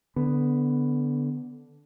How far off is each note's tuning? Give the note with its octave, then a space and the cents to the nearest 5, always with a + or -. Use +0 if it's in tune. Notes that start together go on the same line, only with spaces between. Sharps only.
D3 -10 B3 +5